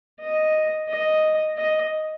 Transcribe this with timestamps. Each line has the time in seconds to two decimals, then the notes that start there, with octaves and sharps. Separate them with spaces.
0.20 D#5
0.89 D#5
1.57 D#5